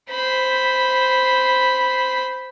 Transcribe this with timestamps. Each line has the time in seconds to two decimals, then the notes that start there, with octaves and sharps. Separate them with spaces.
0.10 C5 B5